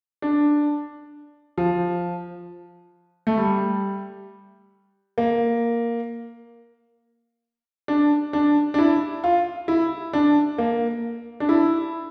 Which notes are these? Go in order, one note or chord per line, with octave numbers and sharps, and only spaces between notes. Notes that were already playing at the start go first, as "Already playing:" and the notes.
D4
F3
A3
G3
A#3
D4
D4
D4
E4
F4
E4
D4
A#3
D4
E4